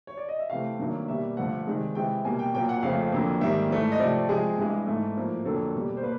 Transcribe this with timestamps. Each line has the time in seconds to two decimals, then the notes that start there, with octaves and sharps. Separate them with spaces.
0.07 C#5
0.18 D5
0.29 D#5
0.39 E5
0.50 C3 E3 A3 F5
0.79 G2 D#3 F#3 A#3
1.08 B2 G3 A#3 E5
1.37 G2 D3 F3 A3 F#5
1.67 C3 D#3 G#3
1.95 C3 E3 G#3 G5
2.25 B2 G3 A#3 G#5
2.39 G5
2.54 A#2 F#3 A#3 G5
2.69 F#5
2.83 F2 C#3 F3 A3 F5
3.12 F2 D3 F#3 A#3
3.41 G#2 D#3 G3 A#3 E5
3.70 G#2 E3 A3
3.92 D#5
3.99 C3 F3 A3 D5
4.29 C3 F3 G#3 G#4
4.58 G2 E3 G#3
4.87 G#2 E3 A3
5.17 A2 F3 A#3
5.45 F2 D3 F#3 A#3 A4
5.74 B2 G3 A#3
5.97 C5
6.03 A#3 B4